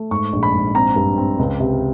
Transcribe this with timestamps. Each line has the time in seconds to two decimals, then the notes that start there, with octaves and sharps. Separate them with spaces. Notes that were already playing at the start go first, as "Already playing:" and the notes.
Already playing: A3
0.11 G#2 C#6
0.33 A#1
0.43 B5
0.53 G#2
0.75 C4 A#5
0.96 G2
1.18 C4
1.39 C#2
1.60 C3